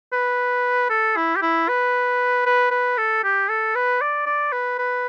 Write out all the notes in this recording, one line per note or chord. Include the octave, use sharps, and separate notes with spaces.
B4
A4
E4
G4
E4
B4
B4
B4
A4
G4
A4
B4
D5
D5
B4
B4